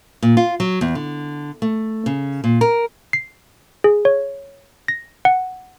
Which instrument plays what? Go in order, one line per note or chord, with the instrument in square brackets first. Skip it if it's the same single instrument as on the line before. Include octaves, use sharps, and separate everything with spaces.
[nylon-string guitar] A#2
F4
F#3
E2
D3
A3
C#3
A#2
A#4
[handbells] C7
G#4
C#5
A#6
F#5